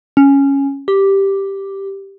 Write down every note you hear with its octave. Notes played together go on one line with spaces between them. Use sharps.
C#4
G4